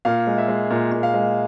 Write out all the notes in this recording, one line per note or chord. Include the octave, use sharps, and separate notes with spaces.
A#2 F5
G#3
E5
G#3
A#2
A#2
F5
G#3